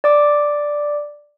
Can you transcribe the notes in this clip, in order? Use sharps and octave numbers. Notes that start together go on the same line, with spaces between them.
D5 D6